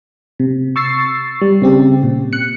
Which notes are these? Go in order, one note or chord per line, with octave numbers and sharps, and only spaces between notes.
C3
C#6 E6 A6 C7
G3
C#3 C4 G4
A#2
F#6 C#7